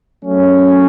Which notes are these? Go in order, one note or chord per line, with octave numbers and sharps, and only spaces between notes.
F#3 A3 C#4